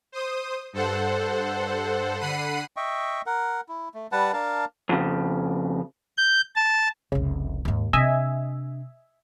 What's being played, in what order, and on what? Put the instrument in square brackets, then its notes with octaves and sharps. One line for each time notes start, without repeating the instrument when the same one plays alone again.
[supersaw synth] C5 D#6
G2 A4 C5 F#5
D3 F#5 B5 C7 D#7
[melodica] D#5 E5 G5 C#6
A#4 F#5
E4
A3
G3 B4 F#5 A5
D4 A#4 F5 A5
[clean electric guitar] F2 C#3
[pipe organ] G6
A5
[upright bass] F1 C2 [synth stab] C#3
[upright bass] D#2 G#2
[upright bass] C3 D4 [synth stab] D#5 E5 G#5